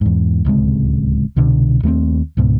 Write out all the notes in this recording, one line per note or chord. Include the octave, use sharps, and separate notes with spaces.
E2 G#2
D1 C#2 C3 G#3
C2 B2 D3
D#2 A3 A#3 C4
C#2 G#2 B2